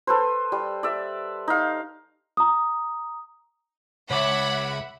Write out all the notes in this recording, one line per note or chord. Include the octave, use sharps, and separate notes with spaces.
A4 B4 C5
G3
D5 E5
D#4 F5
A#5 D#6
C#2 C#5 E5 F#5 B5 D6